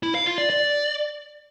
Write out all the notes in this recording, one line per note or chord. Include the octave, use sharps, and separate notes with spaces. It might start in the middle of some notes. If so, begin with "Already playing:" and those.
E4
F5
F4
D5
D5